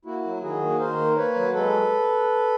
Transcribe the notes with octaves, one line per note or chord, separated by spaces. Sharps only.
A#3 E4 F#4
F#3
D#3 F#4 G#4
A#3
D#3 A#4 C5
A#3
A#3 B4 C#5
F#3
G#3 A4 B4